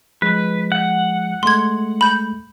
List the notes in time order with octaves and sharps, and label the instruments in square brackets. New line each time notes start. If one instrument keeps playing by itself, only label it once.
[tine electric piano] F3 G#3 [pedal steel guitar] B4
[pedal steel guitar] F#5
[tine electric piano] G#3 A3 [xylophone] C6 G#6
[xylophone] B5 G6